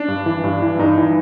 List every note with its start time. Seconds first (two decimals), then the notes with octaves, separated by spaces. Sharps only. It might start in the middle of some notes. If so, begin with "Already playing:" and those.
Already playing: D4
0.08 G2
0.26 E3
0.44 G2
0.62 E3
0.79 G2 D#4
0.98 E3